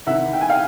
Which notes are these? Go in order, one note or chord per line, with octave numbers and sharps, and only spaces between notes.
C2 C3 D#3 E5 F#5
G5
G#5
F5 G5